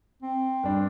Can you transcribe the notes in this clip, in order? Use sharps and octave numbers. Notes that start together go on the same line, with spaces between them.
C4
G2 D4